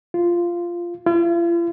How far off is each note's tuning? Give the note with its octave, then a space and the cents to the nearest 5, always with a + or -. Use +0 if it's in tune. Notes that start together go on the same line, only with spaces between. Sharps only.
F4 -10
F4 -45